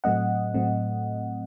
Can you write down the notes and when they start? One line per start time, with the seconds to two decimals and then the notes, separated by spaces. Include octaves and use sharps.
0.04 A2 F#3 A3 C4 D#5 F#5
0.54 A2 F#3 A3 C4